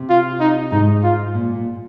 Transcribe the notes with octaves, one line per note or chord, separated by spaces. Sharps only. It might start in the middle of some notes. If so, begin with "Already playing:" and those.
Already playing: C3
F4
D#4
G#2 D#4
F4
A#2
A#2